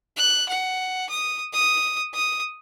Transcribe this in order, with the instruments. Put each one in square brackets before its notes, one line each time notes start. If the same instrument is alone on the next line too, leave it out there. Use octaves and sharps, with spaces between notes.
[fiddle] F#6
F#5
D#6
D#6
D#6